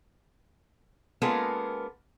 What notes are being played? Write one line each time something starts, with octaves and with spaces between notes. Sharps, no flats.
G#3 A#3 B3 C#4 F4 A4